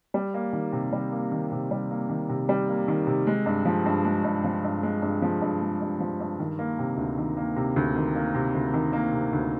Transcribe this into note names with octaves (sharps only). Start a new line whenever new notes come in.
G3
A#3
D#3
C3
G3
A#3
D#3
C3
G3
A#3
D#3
C3
G3
A#3
D#3
C3
G#3
G2
F3
G2
G#3
G2
F3
G2
G#3
G2
F3
G2
G#3
G2
F3
G2
D#3
A#3
C3
D2
D#3
A#3
C3
D2
D#3
A#3
C3
D2
D#3
A#3
C3
D2